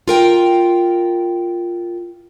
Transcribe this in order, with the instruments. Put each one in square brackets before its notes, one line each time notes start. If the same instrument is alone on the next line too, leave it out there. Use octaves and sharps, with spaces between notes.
[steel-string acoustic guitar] F4 A#4 G5